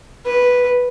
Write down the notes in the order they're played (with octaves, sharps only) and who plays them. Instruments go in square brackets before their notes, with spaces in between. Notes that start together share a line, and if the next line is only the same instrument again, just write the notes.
[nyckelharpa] B4